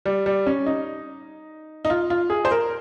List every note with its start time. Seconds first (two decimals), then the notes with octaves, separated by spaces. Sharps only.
0.06 G3
0.26 G3
0.46 C#4
0.66 D#4
1.85 D#4
1.90 F4
2.10 F4
2.30 G#4
2.45 C5
2.51 A#4